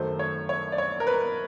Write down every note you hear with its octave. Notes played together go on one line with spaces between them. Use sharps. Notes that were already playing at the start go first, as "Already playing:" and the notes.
Already playing: F#2 D#3 F#3 A3 C5
C#5
C#5
D5
C#5
A#4
B4